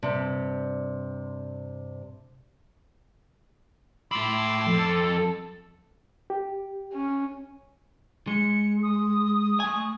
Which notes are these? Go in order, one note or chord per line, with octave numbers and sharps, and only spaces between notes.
G2 C3
A2 B5 C6 D6 E6
F2 A4
G4
C#4
G#3 C#7
D#6
A3 G#5